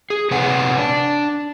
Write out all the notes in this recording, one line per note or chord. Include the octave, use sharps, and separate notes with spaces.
G#4
C3 C4 B4 C#5 F#5 G#5
D4